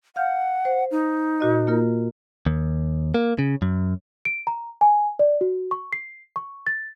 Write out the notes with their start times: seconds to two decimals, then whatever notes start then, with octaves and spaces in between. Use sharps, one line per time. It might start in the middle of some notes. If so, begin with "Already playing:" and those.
0.16 F5 F#5 F6 G6
0.65 C5
0.91 D#4
1.40 A#2 F#4 D#5
1.67 A#3 F4 A#4
2.47 D#2
3.14 A#3
3.39 C#3
3.62 F#2
4.25 D7
4.47 A#5
4.81 G#5
5.19 D5
5.41 F#4
5.71 C#6
5.93 C7
6.36 C#6
6.67 A6